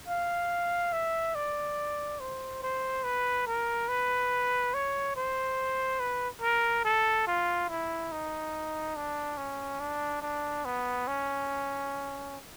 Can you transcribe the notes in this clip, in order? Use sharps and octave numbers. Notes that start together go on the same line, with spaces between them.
F5
E5
D5
C5
C5
B4
A#4
B4
C#5
C5
B4
A#4
A4
F4
E4
D#4
D4
C#4
D4
D4
B3
C#4